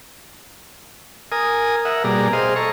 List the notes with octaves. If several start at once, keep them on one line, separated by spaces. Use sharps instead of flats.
A#4 G#5 D#6
A#4 E5 F#5
B2 G3 A#3 G#4 D5 A#5
G#4 C5 D#5 F5
A4 A#5 C#6